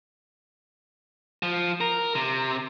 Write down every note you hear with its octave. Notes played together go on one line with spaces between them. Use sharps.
F3
A#4
C3